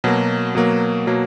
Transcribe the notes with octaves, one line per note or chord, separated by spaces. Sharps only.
B2 F#3 A#3
B2 F#3 A#3
B2 F#3 A#3